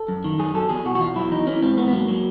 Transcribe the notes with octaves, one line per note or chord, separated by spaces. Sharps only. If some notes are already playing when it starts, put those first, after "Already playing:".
Already playing: A4
F#2
D#3
F#2 G#4
F#3 A4
E2 G#4
B2 F#4
F#4
E2 F4
F#3 E4
E3 D#4
E3 C#4
G#2 C4
G#2 B3
B3
F#3 A#3
F#3